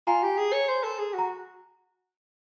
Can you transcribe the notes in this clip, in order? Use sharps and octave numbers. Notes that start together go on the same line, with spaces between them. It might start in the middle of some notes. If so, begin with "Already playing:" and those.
F4 G#5 A#5
G4
G#4
C#5
C5
A4
G#4
F#4 A#5